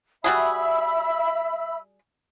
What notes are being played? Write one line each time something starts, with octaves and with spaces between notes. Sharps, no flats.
G3 F#4 G#4 E5 B5 E6